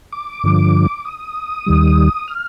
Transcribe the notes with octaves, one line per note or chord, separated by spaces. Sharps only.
D6
G2 D3 F3
D#6
D#2 D#3 G3
F6